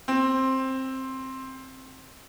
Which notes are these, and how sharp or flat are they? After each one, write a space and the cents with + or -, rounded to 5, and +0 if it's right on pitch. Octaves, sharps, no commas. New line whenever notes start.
C4 +10